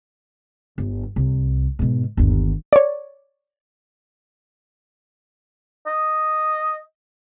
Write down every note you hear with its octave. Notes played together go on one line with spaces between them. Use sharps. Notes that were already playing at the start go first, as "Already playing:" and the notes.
G1
C2
G#2 B2
G1 D#2
C#5 D5
D#5